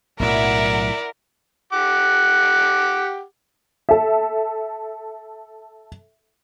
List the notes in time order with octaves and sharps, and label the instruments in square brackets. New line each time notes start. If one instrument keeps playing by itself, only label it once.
[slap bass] B1 A2 F#3 [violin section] E4 E5 F#5 [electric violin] A#4 [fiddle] D5
[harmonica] G4 F#5 D6
[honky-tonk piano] A4 E5